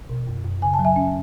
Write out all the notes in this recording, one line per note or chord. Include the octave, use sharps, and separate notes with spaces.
B2
F#2
F#2
C#3 G#5
A5
F#3
E5 G#5
C#4